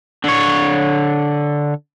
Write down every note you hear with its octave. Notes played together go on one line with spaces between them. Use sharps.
D3 C#5